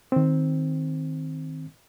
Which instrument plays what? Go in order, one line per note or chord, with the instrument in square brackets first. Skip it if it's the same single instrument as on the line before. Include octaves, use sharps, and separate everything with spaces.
[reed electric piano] D#3 C4